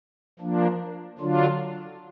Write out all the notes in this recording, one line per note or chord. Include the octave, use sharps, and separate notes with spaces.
F3 A#3 D4
D3 F#3 D4 F4